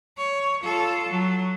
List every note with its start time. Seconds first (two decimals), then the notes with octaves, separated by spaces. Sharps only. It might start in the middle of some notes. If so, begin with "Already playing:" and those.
0.18 C#5
0.63 F4 A4
1.09 F#3